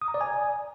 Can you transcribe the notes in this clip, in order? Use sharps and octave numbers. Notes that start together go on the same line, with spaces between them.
D#6
A#5
D5
G#5